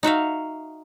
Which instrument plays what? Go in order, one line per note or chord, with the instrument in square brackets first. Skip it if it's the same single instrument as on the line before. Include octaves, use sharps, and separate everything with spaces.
[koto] D#4 F#4 E5 F5